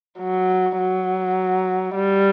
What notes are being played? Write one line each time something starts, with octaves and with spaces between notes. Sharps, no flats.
F#3
F#3
G3